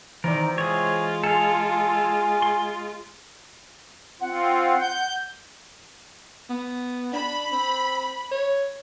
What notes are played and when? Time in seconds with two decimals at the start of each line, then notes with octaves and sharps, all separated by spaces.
0.24 C3 D#3 E3 A#4 D5
0.58 G#3 F4 G#4 C#5
1.24 G#4 A4 F5
2.42 C6
4.21 C4 F4 F#5
4.80 G6
6.50 B3
7.13 D4 B5
7.52 C4
8.32 C#5